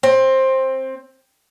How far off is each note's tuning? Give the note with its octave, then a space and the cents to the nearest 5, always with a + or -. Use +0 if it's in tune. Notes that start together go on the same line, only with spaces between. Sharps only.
C4 +15